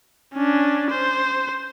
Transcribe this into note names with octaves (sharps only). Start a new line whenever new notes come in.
C#4 D4
C5